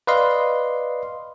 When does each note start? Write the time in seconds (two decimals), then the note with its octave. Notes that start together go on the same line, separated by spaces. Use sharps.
0.07 B4 D5 D#5 F5 C6